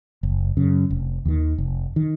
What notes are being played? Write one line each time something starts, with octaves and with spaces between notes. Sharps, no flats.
F#1
F#2 C#3
F1
D#2 D#3
F1
D#3